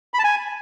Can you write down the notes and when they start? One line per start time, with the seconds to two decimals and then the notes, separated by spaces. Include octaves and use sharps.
0.14 B5
0.19 A5
0.24 G#5